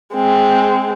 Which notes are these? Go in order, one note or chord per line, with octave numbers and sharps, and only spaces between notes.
G#3 C4